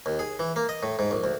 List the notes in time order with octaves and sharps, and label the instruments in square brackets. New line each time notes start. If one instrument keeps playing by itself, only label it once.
[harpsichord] D#2
G#4
E3
A#3
D#5
A2
G#2
A#1
D2